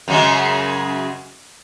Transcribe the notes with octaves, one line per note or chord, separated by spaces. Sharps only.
F#2 C#3 G#3